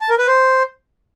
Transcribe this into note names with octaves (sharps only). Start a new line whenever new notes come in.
A5
A#4
B4
C5